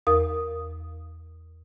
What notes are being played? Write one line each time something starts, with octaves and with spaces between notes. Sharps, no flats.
E2 A#4 D#6